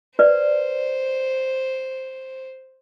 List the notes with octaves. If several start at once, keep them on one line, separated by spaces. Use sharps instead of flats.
B4 C5 D5